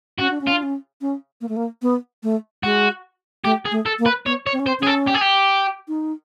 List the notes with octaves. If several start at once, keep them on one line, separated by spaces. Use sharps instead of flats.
C#4 F#4
D4
C#4
F4
D4
C#4
C#4
A#3
A3
A#3
B3
A3
G#3 F#4
A3 G4
G#4
A3
A4
A#3
B4
B3 C#5
C#5
C4
C#4
C4 C5
C#4 G#4
A4
G4
G#4
G4
D#4